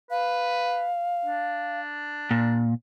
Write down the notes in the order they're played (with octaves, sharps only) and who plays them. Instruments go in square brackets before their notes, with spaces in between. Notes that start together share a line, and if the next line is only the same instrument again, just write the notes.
[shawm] B4 [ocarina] F5
[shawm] D4
[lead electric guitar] A#2